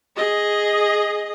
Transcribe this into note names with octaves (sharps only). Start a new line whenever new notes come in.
G#4 D#5